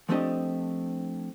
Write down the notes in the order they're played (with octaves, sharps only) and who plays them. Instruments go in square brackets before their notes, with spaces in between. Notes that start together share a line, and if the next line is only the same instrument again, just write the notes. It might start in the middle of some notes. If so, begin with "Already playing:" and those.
[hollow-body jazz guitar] F3 A3 C4 D4 G4 D#5